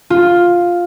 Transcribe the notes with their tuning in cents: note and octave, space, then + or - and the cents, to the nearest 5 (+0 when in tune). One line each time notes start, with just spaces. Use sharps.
F4 +5